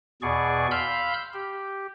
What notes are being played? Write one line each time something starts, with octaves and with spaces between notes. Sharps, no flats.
E2 B2 G#4 D5 C#6
F5 B5 C6 E6 F6 G6
G4